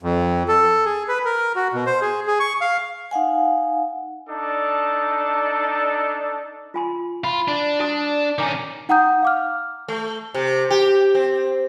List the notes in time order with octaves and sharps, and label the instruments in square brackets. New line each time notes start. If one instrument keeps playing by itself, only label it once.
[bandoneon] F2
A4
G#4
B4
A#4
F#4
B2
C5
G#4
G#4
C#6
F5
[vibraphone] D#4 F5 F#5 G#5
[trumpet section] D4 D#4 A4 D5 A5
[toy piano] F4 G#5 C6
[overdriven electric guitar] F4 [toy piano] B5
[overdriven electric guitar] D4
[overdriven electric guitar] D4 [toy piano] F#4 A5 D#6
[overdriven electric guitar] D#3 C#4 [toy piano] G#5 A#5 D6
[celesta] D#4 F#5 G5 A#5 D#6 G6
F5 D6 F6
[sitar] A3
C3
G4
C4